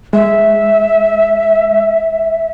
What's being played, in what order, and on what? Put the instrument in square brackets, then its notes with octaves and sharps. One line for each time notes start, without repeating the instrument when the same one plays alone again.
[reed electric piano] G#3 [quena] E5